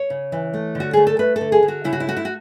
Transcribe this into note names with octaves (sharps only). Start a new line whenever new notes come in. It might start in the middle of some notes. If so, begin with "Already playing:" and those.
Already playing: C#5
C#3
E3
A3
D3
F#4
A3 G#4
A4
A3 B4
A4
D3
G#4
D3
F#4
C#3 E4
F#4
E4
A3 F#4
E4
F#4